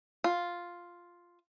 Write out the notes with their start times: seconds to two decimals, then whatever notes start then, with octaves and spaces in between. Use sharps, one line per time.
0.24 F4